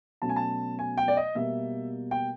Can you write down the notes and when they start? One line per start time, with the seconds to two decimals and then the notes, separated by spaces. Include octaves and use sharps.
0.22 B2 F#3 A3 C#4 A5
0.29 G#5
0.36 A5
0.79 G#5
0.98 G5
1.08 D5
1.17 D#5
1.35 B2 G3 A#3 E5
2.11 G5